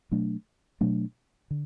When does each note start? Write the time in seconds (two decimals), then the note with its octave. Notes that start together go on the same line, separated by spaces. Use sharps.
0.11 B2 F#3 A3 D4
0.81 B2 F#3 A3 D4
1.51 D3